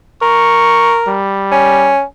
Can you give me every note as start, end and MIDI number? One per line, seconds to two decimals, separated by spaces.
0.22 1.19 70
0.22 0.99 85
1.08 1.94 55
1.52 2.02 61